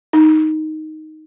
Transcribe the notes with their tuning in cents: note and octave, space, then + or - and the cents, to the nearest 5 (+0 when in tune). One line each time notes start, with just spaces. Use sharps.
D#4 +0